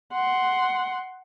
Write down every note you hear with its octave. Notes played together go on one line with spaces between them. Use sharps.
F#5 C6